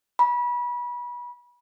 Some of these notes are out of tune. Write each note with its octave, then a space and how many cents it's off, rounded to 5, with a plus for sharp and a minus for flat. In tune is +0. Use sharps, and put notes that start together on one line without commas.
B5 -30